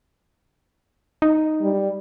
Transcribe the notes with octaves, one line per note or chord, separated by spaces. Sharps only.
D#4
G3